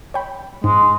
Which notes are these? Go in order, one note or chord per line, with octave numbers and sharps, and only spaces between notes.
C#5 G5 B5
G#2 G#3